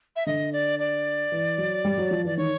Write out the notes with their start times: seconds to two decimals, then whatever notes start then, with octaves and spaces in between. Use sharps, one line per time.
0.16 E5
0.26 D3 D#5
0.53 D5
0.79 D5
1.32 E3
1.58 F#3
1.85 G3
1.98 F#3
2.11 F3
2.24 E3 D5
2.37 D#3 C#5